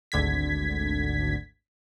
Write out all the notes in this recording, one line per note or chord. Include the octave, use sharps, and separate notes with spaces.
G#1 D2 D3 G#6 B6